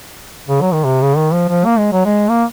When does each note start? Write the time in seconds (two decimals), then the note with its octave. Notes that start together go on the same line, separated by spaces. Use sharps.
0.49 C#3
0.61 F#3
0.72 D#3
0.84 C3
1.01 C#3
1.17 D#3
1.33 F3
1.49 F3
1.65 A#3
1.78 G#3
1.92 F#3
2.05 G#3
2.30 A#3